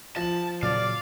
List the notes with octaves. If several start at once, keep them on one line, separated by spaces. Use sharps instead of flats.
F3 A5 F#7
A#2 C#3 F#3 D5 F5